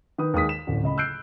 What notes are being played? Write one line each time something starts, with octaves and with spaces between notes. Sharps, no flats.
D#3 B4 D#6
D#2 G#3 D#6 B6
E7
D1 A1
C#2 D#5 B5
E6 F#6 G6 C7 D7